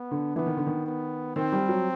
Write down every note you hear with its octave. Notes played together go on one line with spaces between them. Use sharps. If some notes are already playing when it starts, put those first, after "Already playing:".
Already playing: B3
D3
E3 B3
D#3
D3
D#3
B3
D#3 C4
G3
F#3